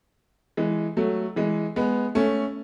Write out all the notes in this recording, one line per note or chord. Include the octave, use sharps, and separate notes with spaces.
E3 G#3
F#3 A3
E3 G#3
G#3 B3
A3 C#4